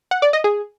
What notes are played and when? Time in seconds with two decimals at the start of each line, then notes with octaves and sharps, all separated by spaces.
0.11 F#5
0.22 D5
0.33 D#5
0.44 G#4